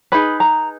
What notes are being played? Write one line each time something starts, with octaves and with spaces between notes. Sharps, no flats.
D#4 G#4 B4 B5
A#5